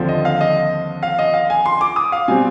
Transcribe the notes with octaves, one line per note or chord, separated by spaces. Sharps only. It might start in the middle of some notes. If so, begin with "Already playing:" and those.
Already playing: D#2 D3 F3 C4
D#5
F5
D#5
F5
D#5
F5
G#5
C6
D6
D#6
F5
B2 G3 C4 G#5